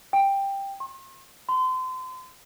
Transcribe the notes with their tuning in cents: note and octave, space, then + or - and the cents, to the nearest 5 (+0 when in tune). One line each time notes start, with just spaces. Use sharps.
G5 +10
C6 +45
C6 -35